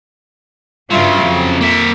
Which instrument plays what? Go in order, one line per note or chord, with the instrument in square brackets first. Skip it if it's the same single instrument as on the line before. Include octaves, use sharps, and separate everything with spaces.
[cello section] G2 F4 E5 [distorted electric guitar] C#3 F#3
[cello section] F2
[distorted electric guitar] A#3 E5